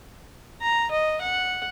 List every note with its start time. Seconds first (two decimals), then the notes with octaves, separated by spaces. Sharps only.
0.62 A#5
0.91 D#5
1.21 F#5